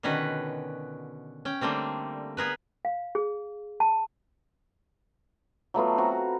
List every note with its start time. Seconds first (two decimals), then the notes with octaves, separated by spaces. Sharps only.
0.03 B2 D3 D#3 C#4 F#4 B4
1.45 C#4 G5
1.61 D3 G3 A3 A#3 C4
2.37 B3 G#4 A#4 B4
2.85 F5
3.15 G#4
3.80 A5
5.74 F#3 A3 B3 F4
5.98 C4 F#4 A#5